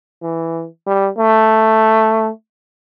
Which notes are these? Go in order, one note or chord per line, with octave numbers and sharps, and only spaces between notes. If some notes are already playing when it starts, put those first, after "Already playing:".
E3
G3
A3